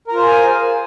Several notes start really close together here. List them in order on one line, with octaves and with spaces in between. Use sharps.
A#4 F4 C5 G#4 G#5